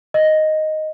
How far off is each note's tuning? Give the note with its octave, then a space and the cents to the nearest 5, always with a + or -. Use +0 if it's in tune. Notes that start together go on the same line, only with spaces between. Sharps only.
D#5 +0